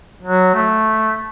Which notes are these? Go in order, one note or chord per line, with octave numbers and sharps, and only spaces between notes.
F#3
A3